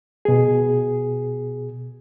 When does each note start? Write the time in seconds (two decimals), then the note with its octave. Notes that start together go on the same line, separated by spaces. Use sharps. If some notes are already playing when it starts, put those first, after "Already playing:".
0.25 B2 G#4